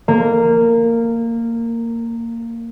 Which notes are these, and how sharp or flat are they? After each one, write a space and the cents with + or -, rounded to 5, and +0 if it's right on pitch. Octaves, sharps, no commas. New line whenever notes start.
A#3 -15